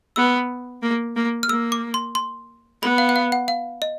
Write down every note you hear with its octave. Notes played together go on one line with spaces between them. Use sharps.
B3 E6
A#3
A#3
F6
A#3 E6
D6
C6
C6
B3 B5
F5
F#5
F5
F#5
F5
D#5